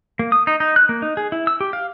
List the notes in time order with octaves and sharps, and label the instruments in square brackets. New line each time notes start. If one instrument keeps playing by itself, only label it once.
[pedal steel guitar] A#3
D#6
D#4
D#4
F#6
A#3
D#4
G#4
E4
E6
G4
F5